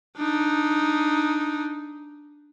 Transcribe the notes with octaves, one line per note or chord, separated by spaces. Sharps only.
D4 D#4